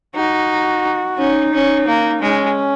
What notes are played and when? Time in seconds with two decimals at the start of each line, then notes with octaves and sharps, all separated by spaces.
0.16 D#4 F#4
1.18 C#4 D#4
1.53 C#4
1.87 A#3
2.22 G#3 C#4